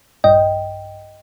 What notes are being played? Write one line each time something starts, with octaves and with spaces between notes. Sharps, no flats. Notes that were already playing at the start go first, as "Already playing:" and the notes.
A#1 G2 D#5 G5